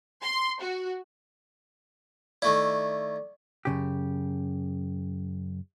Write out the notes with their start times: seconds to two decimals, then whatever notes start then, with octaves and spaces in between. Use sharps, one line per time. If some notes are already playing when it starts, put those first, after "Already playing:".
0.22 C6
0.60 F#4
2.42 D#3 A3 E4 D5
3.65 F#2 C#3 G4